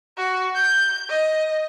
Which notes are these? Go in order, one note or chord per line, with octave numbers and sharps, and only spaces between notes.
F#4
G6
D#5